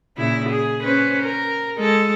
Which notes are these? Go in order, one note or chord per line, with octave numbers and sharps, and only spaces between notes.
A#2 C#3 E4
G#4
C#4 B4 C5
A#4
G#3 A4